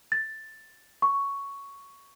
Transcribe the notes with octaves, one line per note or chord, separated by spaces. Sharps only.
A6
C#6